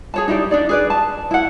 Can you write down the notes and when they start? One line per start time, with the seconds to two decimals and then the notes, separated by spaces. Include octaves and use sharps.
0.14 G#4 C#5 A5
0.28 D#4 E4 G4 D5
0.51 D4 D#4 D5
0.69 G#4 B4 D5
0.90 A5
1.31 E4 F#5